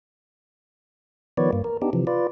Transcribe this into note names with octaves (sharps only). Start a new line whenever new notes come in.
D#3 F3 B3 B4 C#5 D5
G2 A#3
A#4
B3 D4 D#4 G4
C3 E3 F3
F4 B4 D5